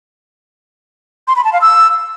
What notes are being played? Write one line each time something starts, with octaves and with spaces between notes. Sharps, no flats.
C6
B5
A5
F5
E6